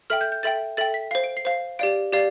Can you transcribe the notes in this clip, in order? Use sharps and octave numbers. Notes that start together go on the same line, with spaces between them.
A4 E5 G5 F6
G6
G6
A4 E5 G5 A6
A4 E5 G5 A6
B6
C5 F5 C7
D7
C7
C5 F5
G4 D5 F5 D7
G4 D5 F5